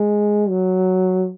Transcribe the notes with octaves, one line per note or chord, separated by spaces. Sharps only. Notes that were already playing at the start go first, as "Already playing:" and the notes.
Already playing: G#3
F#3